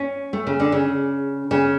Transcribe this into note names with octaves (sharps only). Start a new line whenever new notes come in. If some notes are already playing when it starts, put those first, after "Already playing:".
Already playing: C#4
A3
C#3
D3
C#3
C#3